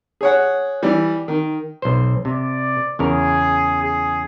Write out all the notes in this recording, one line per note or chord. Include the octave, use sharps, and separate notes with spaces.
G#4 C#5 F#5
E3 G3
D#3
B1 C5
C3 D5
E2 C#3 G#4 A#4
G#4